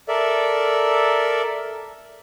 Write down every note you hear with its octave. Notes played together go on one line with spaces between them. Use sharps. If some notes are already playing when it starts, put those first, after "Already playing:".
A4 A#4 D5 E5